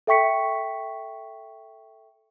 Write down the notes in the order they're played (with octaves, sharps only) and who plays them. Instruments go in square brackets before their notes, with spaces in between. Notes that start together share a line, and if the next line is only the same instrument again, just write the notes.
[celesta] A4 E5 G5 C#6 B6 C#7